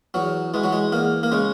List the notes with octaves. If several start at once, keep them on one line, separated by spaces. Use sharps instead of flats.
E2 F#3
E3 G#3
F#3
G#3
E2 A#3
A#3
C#3 G#3